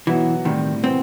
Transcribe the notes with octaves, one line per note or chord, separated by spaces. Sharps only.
B2 E3 F#3 B3 F#4
A2 D#3 G3 C4
C3 E3 B3 C4 F#4